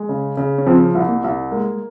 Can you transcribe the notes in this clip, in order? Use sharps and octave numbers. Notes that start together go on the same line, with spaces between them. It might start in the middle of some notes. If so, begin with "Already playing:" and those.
Already playing: G#3
C#3
C#3
C#4
F3 C4
C2
A#3
C2
G#3 A#3